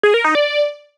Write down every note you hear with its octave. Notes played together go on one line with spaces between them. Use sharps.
G#4
A#4
D#4
D5